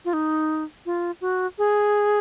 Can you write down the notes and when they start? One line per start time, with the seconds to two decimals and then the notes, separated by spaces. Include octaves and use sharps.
0.05 F4
0.13 D#4
0.86 F4
1.21 F#4
1.58 G#4